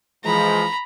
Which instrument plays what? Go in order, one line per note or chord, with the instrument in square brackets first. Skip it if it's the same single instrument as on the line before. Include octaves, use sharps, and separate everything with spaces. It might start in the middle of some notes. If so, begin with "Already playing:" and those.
[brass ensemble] E3 F3 G#3 [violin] A#5 B5